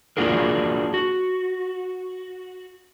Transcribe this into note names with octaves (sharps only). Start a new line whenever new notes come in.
A#3 D4 F4 F#4 G#4 A#4
F#4